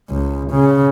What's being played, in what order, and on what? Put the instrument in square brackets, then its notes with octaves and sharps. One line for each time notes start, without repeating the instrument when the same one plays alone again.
[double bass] C#2
C#3